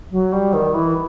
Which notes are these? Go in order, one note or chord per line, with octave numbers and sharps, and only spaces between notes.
F#3
G3
D#3
E3